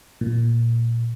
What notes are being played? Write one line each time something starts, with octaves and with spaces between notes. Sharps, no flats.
A#2